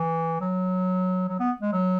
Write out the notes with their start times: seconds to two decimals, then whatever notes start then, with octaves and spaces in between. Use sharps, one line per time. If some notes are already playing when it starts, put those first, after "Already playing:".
Already playing: E3
0.41 F#3
1.29 F#3
1.40 B3
1.62 G#3
1.72 F#3